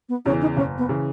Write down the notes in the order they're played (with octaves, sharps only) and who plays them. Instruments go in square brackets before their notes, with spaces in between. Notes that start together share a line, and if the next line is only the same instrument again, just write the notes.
[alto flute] B3
[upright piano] E2 C#3 E3 [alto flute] C#4
[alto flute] D#4
[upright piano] F#1 [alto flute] C#4
[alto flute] B3
[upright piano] C#3 E3